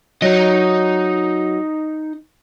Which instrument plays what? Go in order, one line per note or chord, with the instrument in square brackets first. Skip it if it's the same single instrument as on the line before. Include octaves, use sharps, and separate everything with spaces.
[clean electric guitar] F#3 [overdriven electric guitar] D#4 D#5